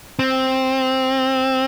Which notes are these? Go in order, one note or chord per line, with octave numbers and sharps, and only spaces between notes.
C4